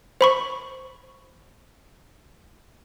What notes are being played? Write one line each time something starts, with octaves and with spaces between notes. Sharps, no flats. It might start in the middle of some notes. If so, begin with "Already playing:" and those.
C5 B5 C#6